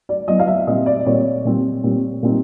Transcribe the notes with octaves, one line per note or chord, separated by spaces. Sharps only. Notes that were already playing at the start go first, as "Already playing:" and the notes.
D5
F#3 B3 E4 D#5
F5
E5
A#2 G3 C4 D#5
D5
A#2 G3 C4 C#5
A#2 G3 C4
A#2 G3 C4
A#2 G3 C4 D#4